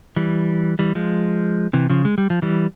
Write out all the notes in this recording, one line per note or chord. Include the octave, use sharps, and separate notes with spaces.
E3 G3
E3 G3
F3 G#3
C3 E3
C#3 F3
G#3
G3
F3
E3 G3